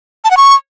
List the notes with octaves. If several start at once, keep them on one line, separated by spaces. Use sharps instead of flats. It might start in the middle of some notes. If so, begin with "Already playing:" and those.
A5
F#5
C#6